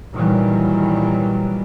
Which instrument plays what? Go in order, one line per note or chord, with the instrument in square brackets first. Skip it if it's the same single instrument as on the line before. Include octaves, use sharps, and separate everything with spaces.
[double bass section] A#2 D#3 E3 F#3 G3